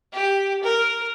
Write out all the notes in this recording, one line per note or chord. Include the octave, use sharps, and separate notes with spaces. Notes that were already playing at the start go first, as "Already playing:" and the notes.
G4
A#4